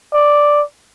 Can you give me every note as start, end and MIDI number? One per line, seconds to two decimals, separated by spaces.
0.14 0.63 74